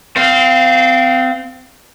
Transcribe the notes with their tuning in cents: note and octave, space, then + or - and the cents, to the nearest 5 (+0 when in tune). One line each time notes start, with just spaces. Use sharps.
C4 -25 F5 -10